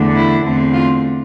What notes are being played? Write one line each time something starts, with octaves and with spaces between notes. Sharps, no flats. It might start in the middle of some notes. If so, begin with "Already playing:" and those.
Already playing: E2 D3 A3 D4
E4
E2 D3 A3 C4
F4